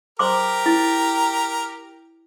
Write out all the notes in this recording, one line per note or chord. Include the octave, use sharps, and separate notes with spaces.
G4 A#4 C5 C6 D6
E4